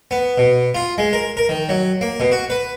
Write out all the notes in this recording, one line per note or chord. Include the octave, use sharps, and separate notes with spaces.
B3
B2
F4
G#3
A#4
A#4
D#3
F#3
A#3
B2
F#4
B4